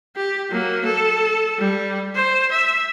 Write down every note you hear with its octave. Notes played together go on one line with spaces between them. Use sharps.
G4
F#3 A#3
A4
G3
C5
E5